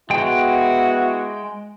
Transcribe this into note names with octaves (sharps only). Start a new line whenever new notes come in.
G#3 B3 E4 F#4 G5